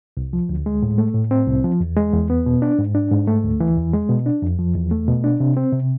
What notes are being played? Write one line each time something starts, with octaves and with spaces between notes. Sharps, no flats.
C2
F3
D2
G#3
A2
A3
A2
C4
C2
F3
E2
G#3
E2
B3
B2
D4
G#2
D4
G#2
A3
D2
E3
E2
G#3
B2
D4
F2
F3
E2
A3
B2
D4
C3
C4
C3